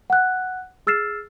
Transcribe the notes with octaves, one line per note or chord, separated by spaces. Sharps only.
F#5 F#6
G#4 E6 F6 A6 C7 E7